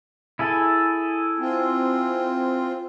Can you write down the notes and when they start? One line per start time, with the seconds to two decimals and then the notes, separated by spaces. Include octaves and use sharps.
0.39 E4 G#4 A4
1.39 C4 F4